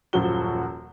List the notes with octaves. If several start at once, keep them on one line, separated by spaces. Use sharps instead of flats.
D#1 F#2 F3 F#4 G7